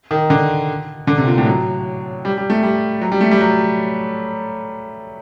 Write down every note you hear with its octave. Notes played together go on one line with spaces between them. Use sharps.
D#3
D3
D3
C3
A#2
A2
F#3
G3
G3
A3
G3
F#3
G3
A3
G3
F#3